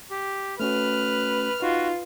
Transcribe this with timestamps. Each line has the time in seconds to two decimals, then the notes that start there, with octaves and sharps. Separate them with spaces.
0.11 G4
0.60 A3 C#4 F#4 B4 F6
1.62 D#4 F4 F#4